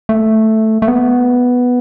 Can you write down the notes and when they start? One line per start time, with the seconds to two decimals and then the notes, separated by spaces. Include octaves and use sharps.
0.09 A3
0.82 A3
0.88 B3